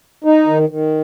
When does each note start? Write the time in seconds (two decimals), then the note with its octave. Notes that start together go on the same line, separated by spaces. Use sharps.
0.24 D#4
0.47 D#3
0.69 D#3